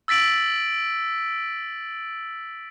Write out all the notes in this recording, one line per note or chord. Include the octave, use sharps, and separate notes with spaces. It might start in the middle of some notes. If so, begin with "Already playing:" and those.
E6 A6 B6 D7 F#7